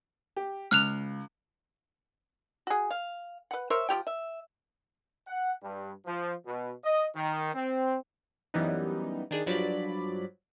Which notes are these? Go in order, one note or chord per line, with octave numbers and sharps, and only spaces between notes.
G4
C#2 F6 F#6 F7
F#4 G#4
F5
B4 F#5
A#4 C5 C#5 E5
F3 A#3 G4 G5
E5
F#5
G2
F3
B2
D#5
D#3
C4
F#2 E3 G3 B3 D#4
D#3 D4 G#4
G2 F3 F#3 D5 B5